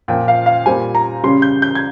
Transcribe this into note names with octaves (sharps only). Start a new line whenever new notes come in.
A#2 F3 C4 G5
F5
F5
A#2 G3 C4 G#5
A#5
C#3 G3 C#4 C6
G6
G6
G#6